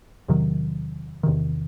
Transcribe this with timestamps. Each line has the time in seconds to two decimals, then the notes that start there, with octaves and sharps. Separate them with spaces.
0.28 E2 C3 D#3 F#3
1.23 E2 C3 D#3